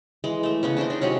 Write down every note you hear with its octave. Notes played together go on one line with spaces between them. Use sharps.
E3 G#3
A3 E5
C#3 B3 C#4
D4 E4 C5 D#5
D4 D#4
C3 F#3 G#3 C#4